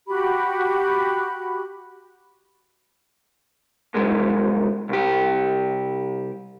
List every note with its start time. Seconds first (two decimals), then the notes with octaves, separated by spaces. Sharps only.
0.08 F#4 G4 B5
3.94 C2 F#2 G#3
4.89 C2 G4